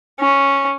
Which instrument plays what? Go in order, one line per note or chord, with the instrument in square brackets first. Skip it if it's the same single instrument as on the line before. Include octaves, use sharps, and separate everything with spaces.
[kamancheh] C#4